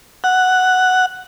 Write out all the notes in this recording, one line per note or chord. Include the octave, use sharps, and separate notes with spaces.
F#5